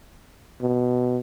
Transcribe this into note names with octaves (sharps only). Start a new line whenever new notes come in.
B2